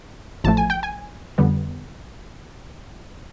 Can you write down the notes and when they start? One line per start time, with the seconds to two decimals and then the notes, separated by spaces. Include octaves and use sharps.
0.44 A1 A2 F3 A3 A5
0.57 G#5
0.70 G5
0.83 G#5
1.38 F2 D3 G3 B3